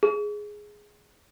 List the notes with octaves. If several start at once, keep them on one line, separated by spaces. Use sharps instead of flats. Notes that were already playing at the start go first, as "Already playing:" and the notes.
G#4